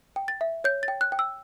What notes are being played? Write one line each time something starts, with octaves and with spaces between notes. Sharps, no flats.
G5
A6
E5
C#5 G6
A6
G5
F#6
G5
E6